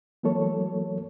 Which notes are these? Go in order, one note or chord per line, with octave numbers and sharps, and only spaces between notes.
E3 F#3 A3 A#3 A4 C#5